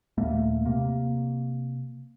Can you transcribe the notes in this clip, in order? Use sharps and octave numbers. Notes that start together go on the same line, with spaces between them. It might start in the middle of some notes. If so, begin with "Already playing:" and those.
D#2 A#2 A3 A#3
C3 A#3